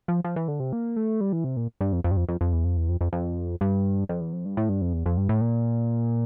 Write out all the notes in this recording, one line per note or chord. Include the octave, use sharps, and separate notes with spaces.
F3
F3
E3
D3
C3
A#3
A3
G3
E3
C3
A#2
G2
F2
F2
G2
F2
F2
F2
E2
F2
E2
F2
F2
F2
G2
F2
E2
F2
G2
A2
G2
F2
E2
F2
G2
A2
A#2